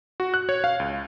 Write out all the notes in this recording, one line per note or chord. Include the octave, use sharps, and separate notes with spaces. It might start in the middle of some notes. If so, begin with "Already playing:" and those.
F#4
F#6
C#5
F5
C#2